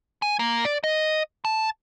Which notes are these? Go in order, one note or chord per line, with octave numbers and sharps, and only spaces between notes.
G#5
A#3
D5
D#5
A5